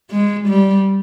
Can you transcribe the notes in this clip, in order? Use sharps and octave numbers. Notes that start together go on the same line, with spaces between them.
G#3
G3